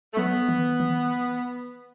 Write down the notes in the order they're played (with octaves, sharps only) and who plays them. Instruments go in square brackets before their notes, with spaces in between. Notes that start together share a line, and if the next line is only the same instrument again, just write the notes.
[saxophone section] A3
[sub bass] F#3 [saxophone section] B3
[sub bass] E3
E3